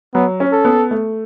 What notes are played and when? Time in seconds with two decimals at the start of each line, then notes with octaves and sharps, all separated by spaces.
0.14 F#3 B3
0.40 C#4
0.52 A4
0.65 B3
0.91 A3